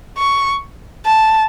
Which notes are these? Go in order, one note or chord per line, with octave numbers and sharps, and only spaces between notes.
C#6
A5